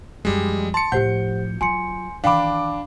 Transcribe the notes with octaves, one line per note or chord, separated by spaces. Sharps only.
F#2 F3 G3 G#3
A5 C6 C#7
A2 F3 G4 C5 F#5 G6
F#3 F4 G#5 C6 C#7
D#3 E3 D4 F5 G5 B5 D6